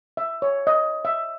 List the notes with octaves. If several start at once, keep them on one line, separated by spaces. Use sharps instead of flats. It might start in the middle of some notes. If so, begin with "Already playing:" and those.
E5
C#5
D#5
E5